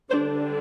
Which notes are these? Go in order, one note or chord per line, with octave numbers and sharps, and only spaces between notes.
D3 G3 D4 C5